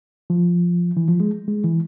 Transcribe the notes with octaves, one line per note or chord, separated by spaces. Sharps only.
F3
E3
F3
G#3
G#3
E3